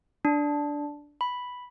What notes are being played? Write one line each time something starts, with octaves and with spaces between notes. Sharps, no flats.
D4
B5